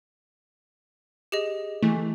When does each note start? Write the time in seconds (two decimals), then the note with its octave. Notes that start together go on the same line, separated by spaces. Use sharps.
1.32 G4 G#4 D#5
1.83 E3 A3